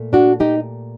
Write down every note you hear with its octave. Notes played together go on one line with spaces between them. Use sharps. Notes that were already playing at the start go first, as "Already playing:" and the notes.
Already playing: A#2 A3
D4 F#4
D#4 G4